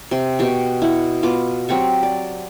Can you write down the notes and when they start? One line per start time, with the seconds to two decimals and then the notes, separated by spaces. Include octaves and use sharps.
0.11 C3 C6
0.39 B2 G4 C#6
0.82 E4 F#5
1.23 B3 F4 D6
1.69 F#3 C4 G4 C#6
2.03 D5